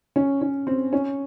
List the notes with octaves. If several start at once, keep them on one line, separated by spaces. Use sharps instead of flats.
C#4
C#4
C4
C#4